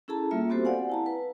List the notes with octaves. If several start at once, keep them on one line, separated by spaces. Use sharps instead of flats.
C#4 E4 G#4 A4 A5 A#5
G3 A#3 F4 E5
B3 C4 F#4 G4 A4 C5
D5 F5 F#5 G#5
E4 A5 A#5
B4